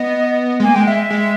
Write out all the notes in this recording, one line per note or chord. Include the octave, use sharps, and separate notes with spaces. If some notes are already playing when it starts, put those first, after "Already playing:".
Already playing: B3 D#5
G#3
A#3 G#5
G#3 G5
G#3 E5
G#3